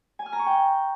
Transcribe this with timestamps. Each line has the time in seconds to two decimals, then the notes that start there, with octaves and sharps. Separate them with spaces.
0.19 G#5
0.26 F6
0.33 A#5
0.39 C#6
0.46 G5